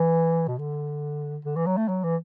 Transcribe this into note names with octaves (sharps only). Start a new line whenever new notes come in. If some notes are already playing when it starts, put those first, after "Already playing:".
Already playing: E3
B2
D3
D3
E3
F#3
A3
F#3
E3